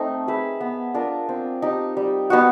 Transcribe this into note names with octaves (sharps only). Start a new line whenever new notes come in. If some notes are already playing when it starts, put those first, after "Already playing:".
Already playing: A3 C4 D#4
G#4 B4 E5
B3
D4 F4 A#4
C4
D#4 G4
G3
B3 D#4 F#4